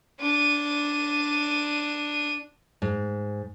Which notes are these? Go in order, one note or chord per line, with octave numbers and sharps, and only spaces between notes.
D4 D#7
G#2